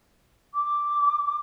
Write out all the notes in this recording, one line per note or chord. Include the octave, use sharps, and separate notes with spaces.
D6